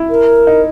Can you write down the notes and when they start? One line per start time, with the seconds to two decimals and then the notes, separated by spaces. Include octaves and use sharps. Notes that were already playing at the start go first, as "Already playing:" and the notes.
Already playing: E4
0.10 A#4
0.47 D#4